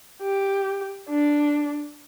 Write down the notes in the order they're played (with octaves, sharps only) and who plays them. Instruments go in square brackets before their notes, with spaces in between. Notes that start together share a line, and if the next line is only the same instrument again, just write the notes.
[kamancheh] G4
D4